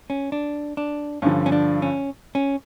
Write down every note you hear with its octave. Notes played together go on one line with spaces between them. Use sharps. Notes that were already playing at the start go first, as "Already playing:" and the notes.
C#4
D4
D4
G2 D3 F3 C#4
C#4
D4
C#4
C#4